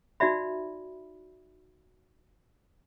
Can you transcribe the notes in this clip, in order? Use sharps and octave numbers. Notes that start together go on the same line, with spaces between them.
D#4 F#4 D5 E5 B5